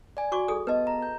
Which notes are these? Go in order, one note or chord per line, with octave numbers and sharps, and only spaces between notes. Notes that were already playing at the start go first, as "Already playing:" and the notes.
D5 G#5
F#4 C#6 D6
G#4 A4 D#6
B3 B4 D#5 A5
A#5
G6